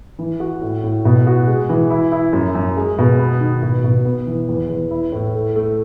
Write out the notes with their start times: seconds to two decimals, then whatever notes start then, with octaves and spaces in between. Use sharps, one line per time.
0.19 E3
0.40 F#4
0.61 A2
0.84 A2
1.05 B2
1.27 F#4
1.47 G#3
1.69 E3
1.90 E4
2.12 E4
2.33 F#2
2.55 F#2
2.76 G#3
2.98 B2
3.19 B3
3.40 D#3
3.63 B2
3.84 B2
4.05 B3
4.27 E3
4.49 E2
4.69 E2
4.91 E4
5.12 A2
5.34 A3
5.56 A3